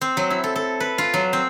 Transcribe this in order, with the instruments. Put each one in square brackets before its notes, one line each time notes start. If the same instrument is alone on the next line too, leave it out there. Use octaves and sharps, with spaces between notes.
[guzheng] C4
F#3
E4
A4
A4
B4
F4
F#3
C4